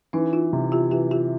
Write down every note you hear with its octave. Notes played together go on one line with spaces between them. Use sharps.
E3 C#4 D#4
D#4 F4
C3
F4 G4
E3 F4 G4
F4 G4